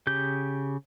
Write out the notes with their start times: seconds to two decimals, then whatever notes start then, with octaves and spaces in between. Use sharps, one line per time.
0.07 C#3 G4 G6